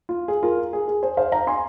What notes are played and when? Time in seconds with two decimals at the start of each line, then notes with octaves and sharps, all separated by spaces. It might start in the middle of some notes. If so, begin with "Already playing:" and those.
0.09 F4
0.28 G#4
0.43 F4 A#4
0.73 G#4
0.88 G#4
1.03 G#4 C5
1.17 C5 F5
1.32 F5 A#5
1.47 G#5 C6